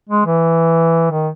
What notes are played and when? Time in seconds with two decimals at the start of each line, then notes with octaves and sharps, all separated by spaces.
0.10 G#3
0.26 E3
1.11 D#3